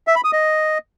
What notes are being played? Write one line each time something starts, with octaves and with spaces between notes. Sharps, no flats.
E5
B5
D#6
D#5